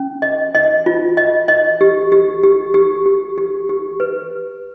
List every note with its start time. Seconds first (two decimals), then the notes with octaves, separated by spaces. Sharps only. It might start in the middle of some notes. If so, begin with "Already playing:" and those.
Already playing: C#4
0.22 D#5
0.55 D#5
0.86 F4
1.17 D#5
1.48 D#5
1.81 G4
2.12 G4
2.43 G4
2.74 G4
3.06 G4
3.38 G4
3.69 G4
4.00 B4